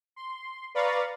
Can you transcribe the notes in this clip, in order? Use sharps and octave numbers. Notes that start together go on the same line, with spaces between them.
C6
B4 D5 F5 A#5 C#6 A6